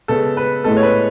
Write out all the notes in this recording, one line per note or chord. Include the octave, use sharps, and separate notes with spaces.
C#3 G#3 B3 A4
B4
A2 G#3 B3 A4
C#5
B4